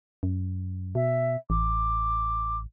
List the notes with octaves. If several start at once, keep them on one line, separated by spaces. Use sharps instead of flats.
F#2
B2 E5
A1 D6